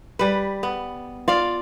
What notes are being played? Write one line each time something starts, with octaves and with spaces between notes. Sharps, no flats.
G3 B4
B3
F4 D5 F5